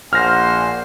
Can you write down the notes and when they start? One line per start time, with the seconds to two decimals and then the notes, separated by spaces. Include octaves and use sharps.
0.13 A#1 C5 F#5 G#5 F6 A#6